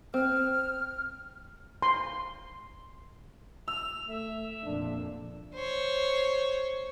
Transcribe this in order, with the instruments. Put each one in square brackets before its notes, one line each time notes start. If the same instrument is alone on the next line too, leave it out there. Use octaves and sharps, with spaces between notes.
[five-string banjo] C4 [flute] F6
[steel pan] C6
[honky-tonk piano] E6 [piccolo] F7
[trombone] A3 [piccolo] E5
[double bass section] F2 A#2 [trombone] D4
[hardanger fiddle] C5 C#5